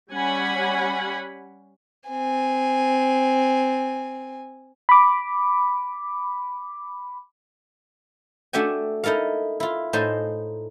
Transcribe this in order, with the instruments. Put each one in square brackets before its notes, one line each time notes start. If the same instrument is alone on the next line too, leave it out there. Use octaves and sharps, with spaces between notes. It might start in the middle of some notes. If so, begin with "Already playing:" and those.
[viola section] G3 C#4 F#5 G#5 B5
[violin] C4 G#5
[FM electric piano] B5 D6
[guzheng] A3 D4 F#4 E5 G5 G#5
D#4 E4 A4 A#4 F5
E4 F4
A2 D#4 C5 G#5 A5